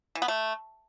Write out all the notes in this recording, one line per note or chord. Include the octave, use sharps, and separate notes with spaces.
E3
B3
A3